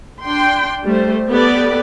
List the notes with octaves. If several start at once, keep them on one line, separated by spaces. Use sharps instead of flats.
D4 G5 C6
G3 A3 C5
B3 G4 A4 B4 D5